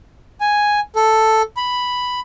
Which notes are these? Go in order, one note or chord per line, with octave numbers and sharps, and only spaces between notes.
G#5
A4
B5